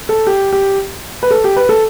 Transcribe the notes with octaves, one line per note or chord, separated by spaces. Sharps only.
A4
G4
G4
B4
A4
G4
B4
A4